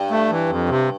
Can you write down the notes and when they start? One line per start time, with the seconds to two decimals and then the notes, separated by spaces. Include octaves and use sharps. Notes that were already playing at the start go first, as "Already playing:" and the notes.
Already playing: G2
0.11 A3
0.30 E3
0.49 F2
0.69 C3